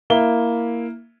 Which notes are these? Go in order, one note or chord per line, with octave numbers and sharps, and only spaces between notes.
A#3 E4 E5 G7